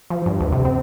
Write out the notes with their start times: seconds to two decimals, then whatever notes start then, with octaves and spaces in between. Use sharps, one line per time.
0.10 F3
0.26 G2
0.40 D2
0.52 C3
0.65 C4